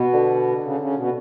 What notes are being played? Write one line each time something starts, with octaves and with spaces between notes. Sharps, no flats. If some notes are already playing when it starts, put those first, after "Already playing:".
Already playing: B2
D3
C#3
C#3
B2